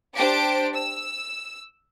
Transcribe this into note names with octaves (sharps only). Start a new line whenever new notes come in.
D4 G4 C5 A5 D6 D7
E6